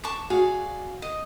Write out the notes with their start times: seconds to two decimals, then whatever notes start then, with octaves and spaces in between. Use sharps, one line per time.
0.04 A5 C#6 D6
0.30 F#4 G#4 D5 F5
1.02 D#5